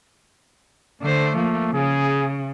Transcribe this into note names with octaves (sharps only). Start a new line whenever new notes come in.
D3 A3 C5
F3 A#3
C#3 G#4